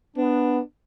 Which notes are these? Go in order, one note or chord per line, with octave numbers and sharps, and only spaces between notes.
B3 D4